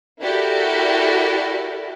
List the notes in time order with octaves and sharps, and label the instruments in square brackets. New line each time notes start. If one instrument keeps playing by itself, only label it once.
[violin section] E4 F#4 G4 A4 A#4 D5